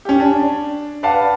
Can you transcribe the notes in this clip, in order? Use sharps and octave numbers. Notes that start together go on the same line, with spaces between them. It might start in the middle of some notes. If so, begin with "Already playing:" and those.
C#4 G4
D4
B4 D5 F5 F#5 A5